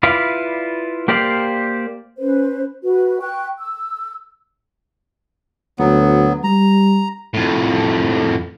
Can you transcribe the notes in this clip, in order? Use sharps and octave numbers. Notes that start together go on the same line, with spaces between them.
E4 F4 B4 D5 F5
A#3 G4 C5 D5 F5
C#4 B4 C5
F#4 B4
G5 C#6 F#6
E6
D2 F#3 B3
G3 A#5
F2 A2